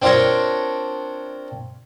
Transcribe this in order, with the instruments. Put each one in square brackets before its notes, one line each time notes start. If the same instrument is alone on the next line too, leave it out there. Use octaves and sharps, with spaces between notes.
[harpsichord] C4 D4 F4 A#4 C#5